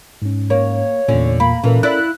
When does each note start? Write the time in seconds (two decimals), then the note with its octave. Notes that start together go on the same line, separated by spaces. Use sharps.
0.22 G#2 C#4
0.50 A#3 C#5
1.08 E2 A#2 D3 C#4
1.40 A#3 B5
1.64 A#2 E3 C#4 A4 A#4
1.83 E4 D5 E5 F#6